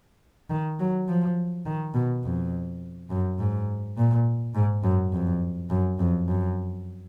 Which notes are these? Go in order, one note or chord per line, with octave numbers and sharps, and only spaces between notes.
D#3
F#3
F3
D#3
B2
F2
F#2
G#2
A#2
G#2
F#2
F2
F#2
F2
F#2